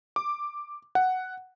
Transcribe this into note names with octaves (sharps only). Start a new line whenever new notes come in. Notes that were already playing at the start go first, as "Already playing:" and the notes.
D6
F#5